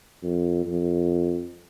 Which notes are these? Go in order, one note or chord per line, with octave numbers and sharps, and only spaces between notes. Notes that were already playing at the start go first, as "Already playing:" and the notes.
F2
F2